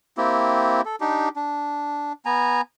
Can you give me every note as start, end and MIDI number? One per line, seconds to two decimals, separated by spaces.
0.17 0.81 58
0.17 0.81 60
0.17 0.81 64
0.17 0.81 67
0.85 0.96 69
1.01 1.29 62
1.01 1.29 63
1.01 1.29 67
1.36 2.13 62
2.26 2.61 59
2.26 2.61 80
2.26 2.61 82